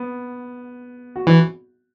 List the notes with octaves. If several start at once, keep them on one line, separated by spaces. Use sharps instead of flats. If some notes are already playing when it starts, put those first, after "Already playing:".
Already playing: B3
F#4
E3 E4